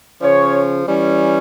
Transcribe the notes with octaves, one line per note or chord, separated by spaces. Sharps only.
C#3 F3 C#4 C#5
E3 G3 C#4